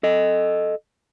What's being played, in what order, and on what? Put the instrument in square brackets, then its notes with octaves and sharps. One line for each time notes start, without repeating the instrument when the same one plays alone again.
[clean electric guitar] A4 D#5